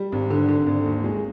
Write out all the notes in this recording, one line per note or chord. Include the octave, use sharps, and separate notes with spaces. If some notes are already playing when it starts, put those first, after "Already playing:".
Already playing: G3
G#1
D3
D3
G#1
D#2
G#3